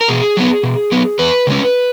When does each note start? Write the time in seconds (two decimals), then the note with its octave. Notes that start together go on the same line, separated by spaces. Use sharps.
0.01 A#4
0.08 B2 G#4
0.37 F#3 B3
0.63 B2
0.92 F#3 B3
1.19 E2 B4
1.47 C#3 G#3 C#4